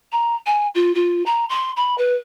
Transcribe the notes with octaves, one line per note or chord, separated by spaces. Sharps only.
A#5
G#5
F4
F4
A#5
C6
B5
B4